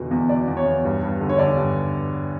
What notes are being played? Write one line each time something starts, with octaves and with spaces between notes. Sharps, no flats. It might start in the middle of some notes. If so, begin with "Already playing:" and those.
Already playing: E2 B2 D3
E2
B2 D5
E2
C#5
E2
G2
G2
D3
C#5
D3 D5
G2